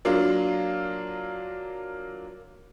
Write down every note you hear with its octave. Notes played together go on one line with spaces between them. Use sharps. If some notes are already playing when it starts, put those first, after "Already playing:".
F#3 A#3 D4 F4